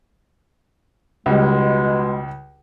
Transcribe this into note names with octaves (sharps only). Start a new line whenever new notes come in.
C#2 B2 G3 G#3